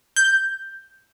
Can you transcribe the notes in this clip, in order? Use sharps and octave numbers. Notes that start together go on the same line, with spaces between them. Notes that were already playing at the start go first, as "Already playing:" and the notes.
G6